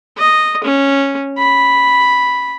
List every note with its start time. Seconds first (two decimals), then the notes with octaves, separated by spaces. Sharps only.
0.18 D#5
0.64 C#4
1.38 B5